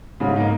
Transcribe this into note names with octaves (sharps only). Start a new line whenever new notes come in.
G#2 C#3
A#3 D#4